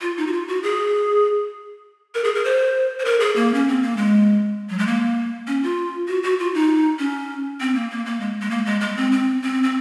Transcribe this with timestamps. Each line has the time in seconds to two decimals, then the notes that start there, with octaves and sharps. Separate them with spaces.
0.01 F4
0.17 D#4
0.27 F#4
0.33 F4
0.48 F#4
0.63 G#4
2.15 A#4
2.24 G#4
2.35 A#4
2.45 C5
3.00 C5
3.05 A#4
3.20 G#4
3.36 A#3
3.54 C#4
3.68 C4
3.83 A#3
3.97 G#3
4.69 F#3
4.78 G#3
4.87 A#3
5.47 C#4
5.63 F4
6.08 F#4
6.24 F#4
6.39 F4
6.54 D#4
6.99 C#4
7.60 C4
7.75 A#3
7.91 A#3
8.06 A#3
8.20 G#3
8.41 G#3
8.51 A#3
8.66 G#3
8.81 G#3
8.97 C4
9.12 C4
9.42 C4
9.63 C4